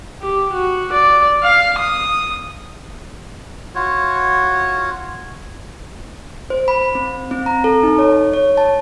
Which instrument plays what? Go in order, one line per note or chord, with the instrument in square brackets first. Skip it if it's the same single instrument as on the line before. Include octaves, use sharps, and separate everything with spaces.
[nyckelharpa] G4
F#4
D5
F5
D#6
[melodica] F4 F#4 C#5
[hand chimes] C5
B5
C4
C4
A#5
A4
D#4
C#5
C#5
A5